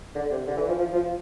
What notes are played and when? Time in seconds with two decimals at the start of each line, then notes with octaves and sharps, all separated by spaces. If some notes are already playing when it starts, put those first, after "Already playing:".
0.16 D3
0.31 C3
0.47 D3
0.57 E3
0.68 F3
0.78 F3
0.93 F3